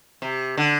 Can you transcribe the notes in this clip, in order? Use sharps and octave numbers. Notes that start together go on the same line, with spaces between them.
C3
D3